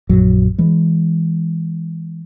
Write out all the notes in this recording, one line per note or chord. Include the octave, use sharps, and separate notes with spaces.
A#1 F#2 F#3
E3 G#3